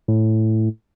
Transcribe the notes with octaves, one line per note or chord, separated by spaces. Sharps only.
A2